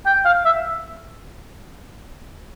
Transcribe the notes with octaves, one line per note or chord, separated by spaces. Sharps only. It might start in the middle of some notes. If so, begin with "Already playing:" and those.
G5
F5
E5